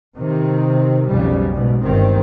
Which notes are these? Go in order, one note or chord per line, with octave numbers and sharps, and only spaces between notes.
C3 D#3 C4
B1 F2 C#3 G3
G#2 B2
G1 D#3 C4